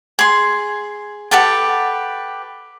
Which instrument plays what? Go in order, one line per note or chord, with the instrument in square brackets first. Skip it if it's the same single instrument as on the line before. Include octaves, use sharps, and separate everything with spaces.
[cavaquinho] G#4 C6
G4 A4 B4 F#5